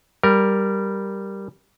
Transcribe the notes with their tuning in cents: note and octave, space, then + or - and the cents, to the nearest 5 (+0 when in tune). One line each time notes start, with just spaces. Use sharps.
G3 +0 A#4 +0